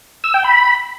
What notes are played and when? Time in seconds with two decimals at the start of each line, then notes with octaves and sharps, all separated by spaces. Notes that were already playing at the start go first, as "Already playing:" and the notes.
0.24 E6
0.34 G5
0.44 B5